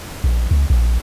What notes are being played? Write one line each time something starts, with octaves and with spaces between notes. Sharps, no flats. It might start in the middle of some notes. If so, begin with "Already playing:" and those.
A#1
C#2
A#1